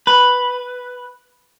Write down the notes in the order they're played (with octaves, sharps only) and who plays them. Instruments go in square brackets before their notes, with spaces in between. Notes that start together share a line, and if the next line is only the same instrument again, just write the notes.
[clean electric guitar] B4